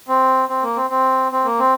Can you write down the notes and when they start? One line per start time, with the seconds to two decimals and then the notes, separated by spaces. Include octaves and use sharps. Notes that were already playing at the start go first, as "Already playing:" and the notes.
0.08 C4
0.49 C4
0.63 A#3
0.76 C4
0.90 C4
1.32 C4
1.45 A#3
1.59 C4